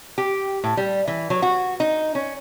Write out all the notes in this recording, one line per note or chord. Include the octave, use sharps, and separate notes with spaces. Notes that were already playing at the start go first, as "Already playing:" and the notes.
G4
A2
G3
E3
F#3
F#4
D#4
C#4